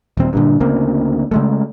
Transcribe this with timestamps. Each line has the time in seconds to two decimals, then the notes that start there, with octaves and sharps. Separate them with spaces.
0.17 D#1 C4
0.33 G2 A#2 D3
0.60 D2 C#3 A#3 C4
1.31 C#3 G#3 A3